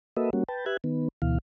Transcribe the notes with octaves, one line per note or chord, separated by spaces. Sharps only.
A#3 F#4 A4 B4 D#5 E5
G3 A#3 C#4 F#4
B4 G5 A5
G4 B4 E5 F#6 G#6
D#3 B3
D2 B2 E3 F5